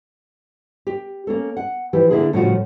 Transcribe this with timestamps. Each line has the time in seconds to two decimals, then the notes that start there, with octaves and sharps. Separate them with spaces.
0.87 G4
1.27 A#3 C#4 A4
1.57 F#5
1.93 E3 F3 E4 G4
2.11 D3 A#3 E4 G#4
2.33 A2 C#3 F3 G3 F4 F#4